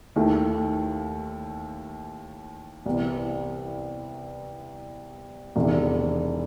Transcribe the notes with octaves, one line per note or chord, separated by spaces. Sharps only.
D#2 D#3 A3 E4
C2 C3 E3 B3
E1 E2 C3 D#3